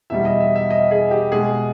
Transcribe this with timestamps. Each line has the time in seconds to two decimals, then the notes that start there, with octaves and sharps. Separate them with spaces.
0.10 E2 B2 G3 E5
0.25 D#5
0.40 E5
0.56 E5
0.71 D#5
0.91 G#4
1.11 G4
1.32 B2 G#3 G#4